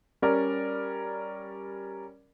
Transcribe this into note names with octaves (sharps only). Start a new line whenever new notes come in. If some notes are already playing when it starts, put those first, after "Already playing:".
G3 C#4 A#4 D5